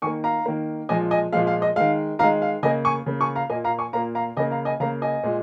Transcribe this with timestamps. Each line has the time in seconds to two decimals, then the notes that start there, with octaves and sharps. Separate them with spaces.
0.02 D#3 A#3 G#5 C#6
0.24 F5 A#5
0.46 D#3 A#3
0.89 A#2 F3 G#3 D#5 G#5
1.11 D#5 G#5
1.32 A#2 F3 G#3 F5
1.47 F5
1.62 D#5
1.76 D#3 G#3 F5
2.19 D#3 G#3 F5 A#5
2.42 F5
2.63 C#3 A#3 D#5 G#5
2.85 G#5 C#6
3.06 C#3 A#3
3.21 G#5 C#6
3.35 F5 A#5
3.50 A#2 A#3 D#5 G#5
3.64 F5 A#5
3.79 G#5 C#6
3.93 A#2 A#3 F5 A#5
4.15 F5 A#5
4.37 C#3 D#5 G#5
4.40 A#3
4.51 F5 A#5
4.65 D#5 G#5
4.80 C#3 A#3 F5 A#5
5.02 D#5 G#5
5.23 A#2 G#3